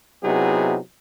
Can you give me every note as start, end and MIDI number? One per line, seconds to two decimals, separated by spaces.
0.23 0.77 48
0.23 0.77 54
0.23 0.77 59
0.23 0.77 63
0.23 0.77 64
0.23 0.77 68